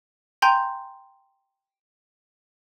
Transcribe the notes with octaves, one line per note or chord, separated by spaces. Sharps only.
G5 G#5 A#5 C6 G6